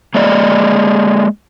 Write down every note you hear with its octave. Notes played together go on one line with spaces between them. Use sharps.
G#3 A#3 G#4 D5 D#5